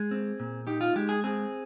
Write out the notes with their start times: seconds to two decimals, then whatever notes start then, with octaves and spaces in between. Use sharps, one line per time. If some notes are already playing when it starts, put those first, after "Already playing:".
Already playing: G#3 G#4
0.11 C4
0.40 A#2
0.67 D#4 G4
0.81 F4
0.96 G#3 G4
1.09 G#4
1.24 C4 G#4